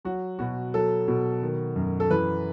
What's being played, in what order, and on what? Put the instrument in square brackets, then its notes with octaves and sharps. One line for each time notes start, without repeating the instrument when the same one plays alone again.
[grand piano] F#3 F#4
B2 F#4
F#3 A4
B2
D#3
F#2
A4
E3 B4